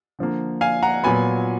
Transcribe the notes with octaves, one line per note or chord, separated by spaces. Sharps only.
D3 F3 A#3
F5 G#5
F#5 A#5
A#2 F#3 B3 G#5 B5